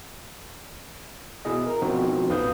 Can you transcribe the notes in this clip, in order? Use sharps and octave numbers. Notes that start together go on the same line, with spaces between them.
B2 E4 G#4 D#5
A#4 A#5
B2 F3 C4 D#4 F4 F#4
A1 E2 B4 F5 D#6 G6